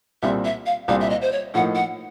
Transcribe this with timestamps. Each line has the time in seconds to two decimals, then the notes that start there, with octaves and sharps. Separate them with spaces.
0.22 C2 A#2 G3 C4 E5
0.45 E5
0.66 F5
0.88 C2 A#2 G3 C4 F5
1.01 E5
1.10 D#5
1.22 C5
1.32 C#5
1.54 A2 F3 A#3 D#4 F#5
1.75 F#5